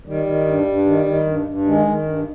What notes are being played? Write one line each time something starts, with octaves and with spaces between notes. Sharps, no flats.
D#3 G3
D#3
G2
G2
D#3
D#3
G2
G2
D#3 G#3
D#3
G2